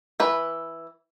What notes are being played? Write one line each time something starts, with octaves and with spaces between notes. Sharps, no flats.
E3 B4